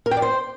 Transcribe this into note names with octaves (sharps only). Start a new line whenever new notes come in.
A#4
G5
D5
C5